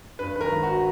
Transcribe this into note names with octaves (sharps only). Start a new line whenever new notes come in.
G2 B4
D#3 A#4 B4
G#1
F#4